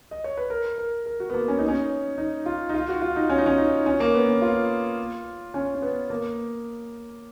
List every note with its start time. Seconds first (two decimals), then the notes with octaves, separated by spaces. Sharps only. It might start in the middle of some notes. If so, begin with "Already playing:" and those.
0.11 D#5
0.24 C#5
0.37 B4
0.50 A#4
0.78 A#4
1.06 A#4
1.20 F#4
1.30 B3
1.34 A#3
1.48 C#4
1.58 D#4
1.68 C#4
2.18 D#4
2.46 F4
2.69 D#4
2.74 F4
2.88 F#4
3.02 F4
3.16 D#4
3.30 C#4
3.38 D#4
3.46 C#4
3.58 D#4
3.86 C#4
4.00 A#3
4.14 B3
4.28 C#4
4.42 F4
5.54 C#4
5.74 C#4
5.82 B3
6.10 A#3